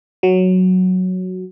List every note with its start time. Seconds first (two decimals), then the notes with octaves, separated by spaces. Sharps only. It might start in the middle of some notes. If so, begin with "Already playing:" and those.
0.23 F#3